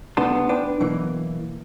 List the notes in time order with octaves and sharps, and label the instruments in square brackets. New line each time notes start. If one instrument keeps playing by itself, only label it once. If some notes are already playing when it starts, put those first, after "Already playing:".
[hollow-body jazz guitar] C2 A3 B3 D4 A5 C6
D4 B4 G5
B2 E3 F#3 A#3